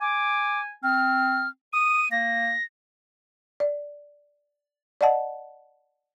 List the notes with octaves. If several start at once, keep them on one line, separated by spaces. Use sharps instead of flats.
G#5 D6
C4 F6
D#6 D#7
A#3 A#6
D5
D5 D#5 F#5 A5